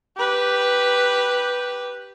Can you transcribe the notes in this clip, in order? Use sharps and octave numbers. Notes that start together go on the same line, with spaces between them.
G4 B4